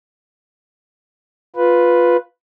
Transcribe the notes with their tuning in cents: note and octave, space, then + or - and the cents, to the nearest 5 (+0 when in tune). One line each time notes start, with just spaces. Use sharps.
F4 +10 B4 +0